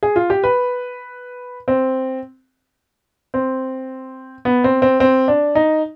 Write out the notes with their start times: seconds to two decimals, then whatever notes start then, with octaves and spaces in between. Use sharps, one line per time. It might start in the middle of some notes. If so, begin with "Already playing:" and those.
0.03 G#4
0.16 F4
0.30 G4
0.44 B4
1.68 C4
3.34 C4
4.45 B3
4.64 C4
4.82 C4
5.00 C4
5.28 D4
5.55 D#4